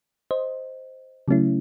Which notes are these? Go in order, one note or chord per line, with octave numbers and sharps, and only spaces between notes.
C5 D#5
C#3 F#3 A3 C#4 E4